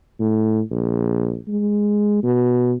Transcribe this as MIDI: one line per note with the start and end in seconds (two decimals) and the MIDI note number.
0.19 0.61 45
0.71 1.37 34
1.48 2.19 56
2.23 2.74 47